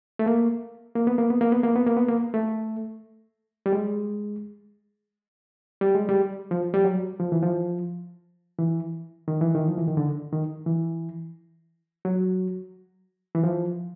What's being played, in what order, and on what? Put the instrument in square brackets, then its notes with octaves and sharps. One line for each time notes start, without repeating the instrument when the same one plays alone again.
[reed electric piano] A3
A#3
A#3
B3
A#3
B3
A#3
B3
A#3
B3
A#3
B3
A#3
A3
G3
G#3
G3
G#3
G3
F3
G3
F#3
F3
E3
F3
E3
D#3
E3
D#3
F3
E3
D#3
D3
D#3
E3
F#3
E3
F3